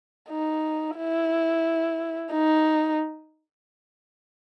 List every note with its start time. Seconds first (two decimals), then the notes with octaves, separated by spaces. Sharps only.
0.30 D#4
0.97 E4
2.32 D#4